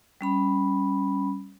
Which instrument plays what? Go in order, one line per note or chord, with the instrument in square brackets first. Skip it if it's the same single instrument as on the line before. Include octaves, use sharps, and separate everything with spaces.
[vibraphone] G3 C#4 B5